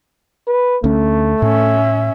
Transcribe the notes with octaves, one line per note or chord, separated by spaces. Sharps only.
B4
D2 A3 C#4
A2 C#4 E5